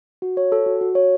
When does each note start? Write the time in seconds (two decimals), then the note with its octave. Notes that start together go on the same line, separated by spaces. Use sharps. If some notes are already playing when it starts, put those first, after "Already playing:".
0.22 F#4
0.37 C#5
0.52 A4
0.66 F#4
0.81 F#4
0.95 C#5